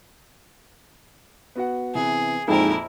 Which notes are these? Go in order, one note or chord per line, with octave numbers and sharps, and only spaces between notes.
B3 F#4 F#5
C3 E3 B3 G#4
A#1 F2 G#2 E4 A4 A#4 G5 G#5